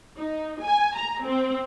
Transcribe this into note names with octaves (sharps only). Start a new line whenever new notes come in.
D#4
G#5
A#5
C4